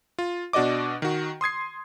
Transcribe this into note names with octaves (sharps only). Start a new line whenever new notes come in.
F4
B2 D4 F#4 D5 D#5 D6
D#3 F#4
C6 D#6 G#6 C7